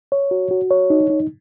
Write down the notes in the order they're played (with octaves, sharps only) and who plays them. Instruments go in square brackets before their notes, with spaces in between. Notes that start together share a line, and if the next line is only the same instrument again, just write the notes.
[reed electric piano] C#5
F#4
F#4
C#5
D#4
D#4